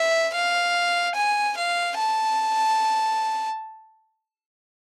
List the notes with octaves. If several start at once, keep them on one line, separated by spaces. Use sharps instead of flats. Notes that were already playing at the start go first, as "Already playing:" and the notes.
Already playing: E5
F5
G#5
F5
A5